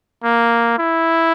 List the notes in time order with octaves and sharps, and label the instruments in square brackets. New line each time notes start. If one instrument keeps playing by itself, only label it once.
[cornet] A#3
E4